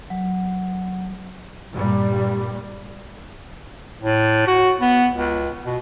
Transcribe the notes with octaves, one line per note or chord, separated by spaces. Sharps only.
F#3
G2 A#2 G3
A2
F#4
B3
C#2
B2